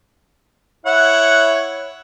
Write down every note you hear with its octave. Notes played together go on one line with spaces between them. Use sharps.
E4 C#5 F#5